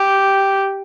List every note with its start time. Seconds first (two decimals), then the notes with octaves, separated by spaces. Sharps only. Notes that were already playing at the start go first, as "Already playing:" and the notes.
Already playing: G4